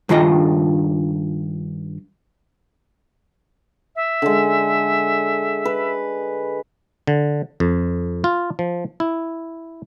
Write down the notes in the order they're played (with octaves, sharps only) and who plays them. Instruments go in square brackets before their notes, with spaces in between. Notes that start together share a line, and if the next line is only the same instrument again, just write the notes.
[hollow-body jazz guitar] G2 D#3 F4 D#5
[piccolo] E5
[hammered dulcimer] D3 G#3
B4
[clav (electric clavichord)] D3
F2
F4
F3
E4